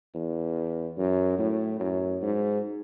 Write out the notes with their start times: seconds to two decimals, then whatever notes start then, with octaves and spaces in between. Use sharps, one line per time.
0.15 E2
0.97 F#2
1.38 A2
1.80 F#2
2.22 G#2